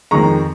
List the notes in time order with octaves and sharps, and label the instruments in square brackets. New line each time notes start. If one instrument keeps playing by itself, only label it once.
[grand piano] F2 D#3 G#3 A#5 C#6